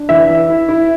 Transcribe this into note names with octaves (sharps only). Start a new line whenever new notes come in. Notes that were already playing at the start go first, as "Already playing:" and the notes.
Already playing: D4
E3 E5
E3
E4
E4